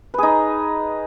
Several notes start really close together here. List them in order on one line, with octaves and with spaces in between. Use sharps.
B4 G#4 D#4